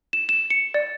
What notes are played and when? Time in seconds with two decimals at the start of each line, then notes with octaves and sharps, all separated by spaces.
0.13 E7
0.29 E7
0.50 C#7
0.74 D5